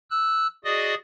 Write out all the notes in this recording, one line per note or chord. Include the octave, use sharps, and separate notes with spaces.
E6 F#6
F#4 G#4 D5 D#5 D#6